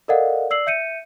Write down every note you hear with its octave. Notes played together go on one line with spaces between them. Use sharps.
A4 A#4 D5 D#5 F5 F#5
D5 E6 C7 F#7
E5 G6 C#7 D#7